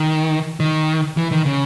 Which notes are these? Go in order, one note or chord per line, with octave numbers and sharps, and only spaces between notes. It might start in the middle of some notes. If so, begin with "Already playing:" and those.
Already playing: D#3
D#3
E3
D#3
C#3